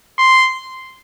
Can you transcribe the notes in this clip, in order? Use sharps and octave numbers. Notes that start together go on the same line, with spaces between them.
C6